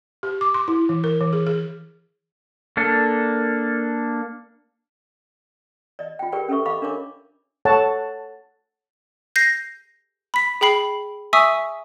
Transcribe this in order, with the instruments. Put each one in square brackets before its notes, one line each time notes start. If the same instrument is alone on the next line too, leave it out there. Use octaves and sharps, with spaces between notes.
[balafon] G4
D6
C6
E4
E3
A#4
E3
G#4
G#4
[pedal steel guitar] A#3 D4 A4
[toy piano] D5 D#5
F4 G5
G4 G#4 A#4 B4 D5 G5
C#4 A4 B4 E5 C#6
D#5 F5 B5 C#6 D6
D4 A#4 C#5 D6
[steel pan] A4 C#5 F#5 A5
[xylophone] G6 A#6 C7
B5 B6
G#4 G5 B5 C7
E5 G#5 C#6 D#6 E6 B6